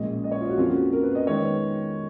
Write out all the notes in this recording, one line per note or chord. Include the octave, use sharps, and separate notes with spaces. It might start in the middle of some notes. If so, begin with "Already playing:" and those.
Already playing: A#1 A#2 G#3 C#4 D#5
D#5
C#5
F4
F#4
F2 F3 A#3 C#4 F4
F#4
A#4
B4
D#5
D#3 G#3 B3 C#5